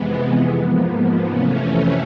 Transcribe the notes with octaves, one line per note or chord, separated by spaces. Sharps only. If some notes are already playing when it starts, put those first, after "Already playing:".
Already playing: F2 C3 E3 G#3 B3
G#2 F3 A#3
F2 C3 E3 A3 C#4